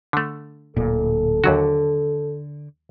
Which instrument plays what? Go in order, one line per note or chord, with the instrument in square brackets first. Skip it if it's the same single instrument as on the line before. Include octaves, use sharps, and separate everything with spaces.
[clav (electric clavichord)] D3 A3
[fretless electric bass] D1 A#2 [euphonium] A4
[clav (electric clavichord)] D#2 F#3 F#4 [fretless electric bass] D3